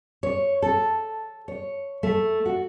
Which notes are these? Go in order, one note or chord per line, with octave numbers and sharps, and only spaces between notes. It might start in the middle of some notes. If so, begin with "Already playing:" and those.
C#5
A4
C#5
A3
F#4